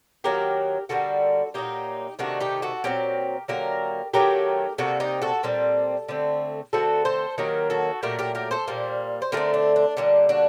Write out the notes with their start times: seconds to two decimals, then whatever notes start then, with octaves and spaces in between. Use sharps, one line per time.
0.24 D#3 F#3 A#3 G4 A#4
0.89 D3 G3 A#3 F#4 A4
1.54 A#2 F#3 A#3 D#4 G4
2.19 C3 D#3 A3 D4 F#4
2.40 D#4 G4
2.62 F#4 A4
2.84 A#2 F#3 C4 G4 A#4
3.48 D3 F#3 A#3 G4 A#4
4.14 D#3 F#3 A3 G4 A#4
4.78 C3 G3 A#3 F#4 A4
5.00 D#4 G4
5.22 F#4 A4
5.43 A#2 G3 C4
6.09 D3 A3 C4
6.73 D3 A3 C4 F#4 A4
7.05 A4 C5
7.38 D#3 F#3 A#3 G4 A#4
7.70 F#4 A4
8.03 A#2 F#3 A3 G4 A#4
8.19 G4 A#4
8.35 G4 A#4
8.51 A4 C5
8.67 A#2 G3 A#3
9.22 C5
9.32 D3 A3 C4 G4 A#4
9.54 D4
9.76 D4
9.97 D3 G3 A#3 D4
10.29 D4 F#4